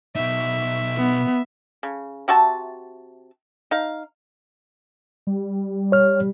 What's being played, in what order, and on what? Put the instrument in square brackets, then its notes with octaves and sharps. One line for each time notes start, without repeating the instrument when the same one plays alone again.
[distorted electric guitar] B2 D#4 [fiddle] E5
[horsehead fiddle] B3
[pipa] C#3
C3 F#4 E5 A5
D#4 F5
[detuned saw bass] G3
[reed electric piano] C#5 F6